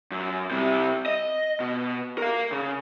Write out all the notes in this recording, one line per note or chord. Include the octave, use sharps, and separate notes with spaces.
F#2
C3 G3
D#5
B2
A#4 F5
C#3